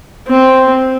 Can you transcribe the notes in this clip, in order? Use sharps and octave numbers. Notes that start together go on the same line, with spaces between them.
C4